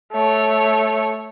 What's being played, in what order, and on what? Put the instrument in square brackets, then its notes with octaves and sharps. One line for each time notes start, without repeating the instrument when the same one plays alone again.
[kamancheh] A3 C#5